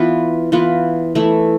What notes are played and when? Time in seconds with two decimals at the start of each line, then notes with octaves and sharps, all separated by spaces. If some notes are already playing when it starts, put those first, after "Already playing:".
Already playing: E3 B3 F4 B4
0.52 E3 B3 F4 B4
1.15 E3 A3 E4